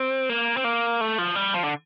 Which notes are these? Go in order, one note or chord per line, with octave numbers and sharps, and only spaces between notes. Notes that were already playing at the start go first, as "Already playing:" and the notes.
Already playing: C4
A#3
C4
A#3
A3
F3
G3
F3
D3